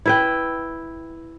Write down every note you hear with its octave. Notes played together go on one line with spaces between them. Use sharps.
E4 B4 G5